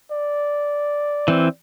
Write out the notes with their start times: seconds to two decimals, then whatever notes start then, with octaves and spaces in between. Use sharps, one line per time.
0.11 D5
1.28 E3 C4